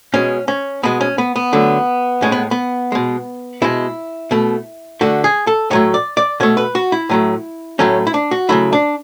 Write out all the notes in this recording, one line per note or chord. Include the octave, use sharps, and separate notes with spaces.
B2 G#3 C#4
C#4
B2 G#3 B3
C#4
B3
B3
D3 F#3 A3
A2 G#3 C#4
B3
B3
B2 G#3
B2 G#3 E4
B2 A3
D3 A3 F#4
G#4
A4
A2 F#3 A3 C#5
D5
D5
B2 A3 C#5
B4
F#4
E4
A2 F#3 A3
A2 F#3 A3 C#4
E4
D4
F#4
C#3 F#3 A3 E4
D4